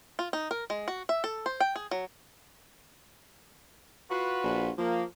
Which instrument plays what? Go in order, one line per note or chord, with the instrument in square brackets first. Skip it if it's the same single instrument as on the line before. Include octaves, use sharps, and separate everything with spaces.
[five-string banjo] F4
D#4
A#4
G#3
F#4
E5
A4
C5
G5
G#4
F#3
[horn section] F4 F#4 B4
[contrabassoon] A#1
[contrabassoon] F3 [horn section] A#3